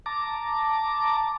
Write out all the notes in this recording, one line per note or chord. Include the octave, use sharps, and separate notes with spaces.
A5 A#5 D6